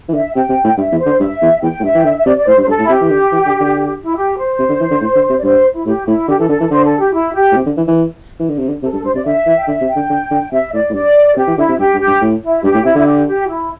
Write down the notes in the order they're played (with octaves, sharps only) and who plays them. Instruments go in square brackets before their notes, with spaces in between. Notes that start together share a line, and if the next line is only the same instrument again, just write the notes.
[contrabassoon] E3
[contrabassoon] D3 [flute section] E5
[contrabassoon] C3 [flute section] G5
[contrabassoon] C3
A2
[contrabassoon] G2 [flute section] E5
[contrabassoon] E2
[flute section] C5
[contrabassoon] D3
[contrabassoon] G2 [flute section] E5
[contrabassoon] E2
[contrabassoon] E2 [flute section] G5
[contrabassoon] A2
[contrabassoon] G2 [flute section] E5
[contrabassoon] E3 [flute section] G5
[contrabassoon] D3 [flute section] E5
[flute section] E5
[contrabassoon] C3 [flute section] D5
[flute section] D5
[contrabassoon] A2 [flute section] C5
[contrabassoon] G2
[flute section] C5
[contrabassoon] G2 [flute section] A4
[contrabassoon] A2
[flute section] E4
[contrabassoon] C3 [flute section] G4
[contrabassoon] E3
D3
E3
D3
D3
[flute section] E4
G4
C5
[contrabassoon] C3
D3
E3
D3
A2
D3
C3
[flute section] D5
[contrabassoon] G2 [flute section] C5
[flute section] E4
[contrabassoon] A2 [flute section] G4
[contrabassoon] A2 [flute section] E4
[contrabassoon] D3 [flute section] G4
[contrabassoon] E3 [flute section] A4
[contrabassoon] D3 [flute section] A4
[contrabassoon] E3 [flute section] A4
[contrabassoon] D3 [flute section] C5
[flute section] A4
G4
E4
G4
[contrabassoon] A2
C3
D3
E3
E3
E3
D3
C3
D3
[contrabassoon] C3 [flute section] A4
[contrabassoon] G2 [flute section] A4
[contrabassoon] G2 [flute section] C5
[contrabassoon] C3 [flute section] D5
[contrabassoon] D3 [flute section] E5
[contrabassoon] E3
[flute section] G5
[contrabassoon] D3 [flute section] E5
[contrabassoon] C3
[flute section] G5
[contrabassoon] D3
D3
D3
[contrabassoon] C3 [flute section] E5
[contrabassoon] A2 [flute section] D5
[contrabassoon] A2
[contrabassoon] G2 [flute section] D5
[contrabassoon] C3 [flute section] G4
[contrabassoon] E3
[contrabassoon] D3 [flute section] E4
[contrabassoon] C3
[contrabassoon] G2 [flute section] G4
[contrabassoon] G2
[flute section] G4
[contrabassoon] G2
A2
[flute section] E4
[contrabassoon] G2 [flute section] G4
[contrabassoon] A2
[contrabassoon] C3 [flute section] E4
[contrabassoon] D3 [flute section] E4
[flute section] G4
G4
E4